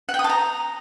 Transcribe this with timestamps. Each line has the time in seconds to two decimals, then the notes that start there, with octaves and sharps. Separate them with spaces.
0.09 F#5
0.14 G5
0.19 D#6
0.24 A5
0.29 A#5